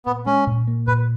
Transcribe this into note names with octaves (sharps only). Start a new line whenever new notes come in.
A#2 B3
G#3 C#4
A#2
A#3
A#2 B4